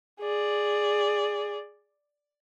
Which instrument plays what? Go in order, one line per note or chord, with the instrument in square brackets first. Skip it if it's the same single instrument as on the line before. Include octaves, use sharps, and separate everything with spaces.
[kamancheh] G#4 D5